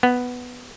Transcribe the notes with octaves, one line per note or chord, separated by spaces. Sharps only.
B3